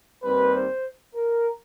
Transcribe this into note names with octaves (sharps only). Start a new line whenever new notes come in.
D#2 D#3 G3 C4 B4
C5
A#4